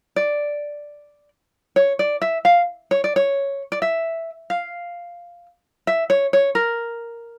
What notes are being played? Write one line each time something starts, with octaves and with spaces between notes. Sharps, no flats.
D5
C#5
D5
E5
F5
C#5
D5
C#5
D5
E5
F5
E5
C#5
C#5
A#4